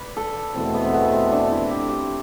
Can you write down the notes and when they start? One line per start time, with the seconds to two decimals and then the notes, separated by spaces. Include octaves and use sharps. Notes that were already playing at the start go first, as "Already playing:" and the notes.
Already playing: B4 D5
0.17 A4
0.55 E2 B2 A3 C4
0.75 B3
0.85 C4
0.94 B3
1.13 C4
1.32 D4
1.52 E4
1.71 G4
1.89 G4